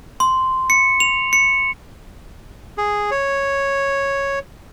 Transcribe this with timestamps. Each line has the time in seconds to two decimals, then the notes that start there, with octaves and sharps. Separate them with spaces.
0.20 C6
0.70 C#7
1.00 F7
1.33 C#7
2.78 G#4
3.11 C#5